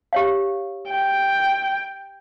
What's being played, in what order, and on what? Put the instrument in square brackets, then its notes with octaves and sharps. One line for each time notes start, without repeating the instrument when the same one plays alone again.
[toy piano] G4 C#5 F5
[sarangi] G5